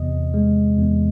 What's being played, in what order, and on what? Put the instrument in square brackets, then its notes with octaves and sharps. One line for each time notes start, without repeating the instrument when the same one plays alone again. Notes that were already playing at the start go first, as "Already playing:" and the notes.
Already playing: [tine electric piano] E2 C3 D#5
G#3
E2